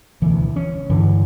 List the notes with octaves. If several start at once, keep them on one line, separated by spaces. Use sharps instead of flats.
E1 D2 E3
C#4
G2 D3 E3